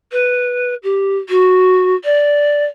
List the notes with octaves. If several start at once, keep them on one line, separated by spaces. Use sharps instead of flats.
B4
G4
F#4
D5